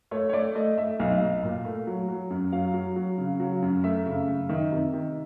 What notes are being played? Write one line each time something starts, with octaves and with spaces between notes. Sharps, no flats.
A3 C#5
C#5
A3 D5
A3 D#5
A3 E5
B1 F5
B1
A#2
A3
F#3
F#3
F#2
F#3 F5
F#3
F#3
C#3
F#3
F#2
A3 E5
C#3
F#2
D#3 E5
C3
D#3